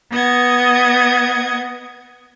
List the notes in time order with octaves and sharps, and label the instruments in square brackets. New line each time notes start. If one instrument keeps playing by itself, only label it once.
[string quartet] B3 D#5 F#5 G#6